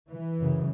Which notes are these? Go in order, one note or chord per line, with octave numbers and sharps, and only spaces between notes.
E3
F#2 C#3